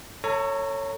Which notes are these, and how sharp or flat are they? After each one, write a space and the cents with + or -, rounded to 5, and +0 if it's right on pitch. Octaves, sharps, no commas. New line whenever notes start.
A4 +30 C#5 +0 A#5 -20